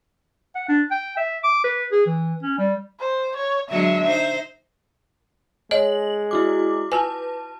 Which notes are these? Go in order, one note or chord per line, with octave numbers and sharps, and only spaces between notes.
F#5
D4
G5
E5
D6
B4
G#4
E3
C#4
G3
C5
C#5
D3 F#3 G#3 E5
D#4 C5
G#3 C#5 D#5 F#7
E4 F#4 D6
F4 B4 G#5 A5